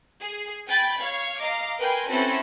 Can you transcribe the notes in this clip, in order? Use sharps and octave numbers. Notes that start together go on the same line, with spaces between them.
G#4
G5 G#5 B5 A6
C#5 F5 G#6
D#5 F5 A#5 D6
A#4 B4 G5 G#5 C6
C4 C#4 E4 F#4 A4 B4